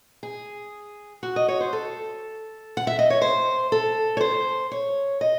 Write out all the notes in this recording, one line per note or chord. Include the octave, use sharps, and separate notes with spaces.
G#4
F#4
D#5
C#5
C5
A4
F#5
E5
D#5
C#5
C5
A4
C#5
C5
C#5
D#5